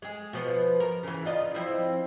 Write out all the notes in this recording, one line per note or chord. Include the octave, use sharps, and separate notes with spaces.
G#3 G#4
B2 F3 B3
A#4
C#3 E3
F4 D5 D#5
F3 C4 E4